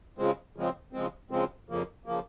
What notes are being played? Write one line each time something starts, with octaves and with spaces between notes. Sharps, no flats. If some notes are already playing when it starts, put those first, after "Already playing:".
C#3 F3 G#3 C4
C#3 F3 G#3 C4
C#3 F3 G#3 C4
C#3 F3 G#3 C4
F2 C#3 F3 A#3
C#3 F3 A#3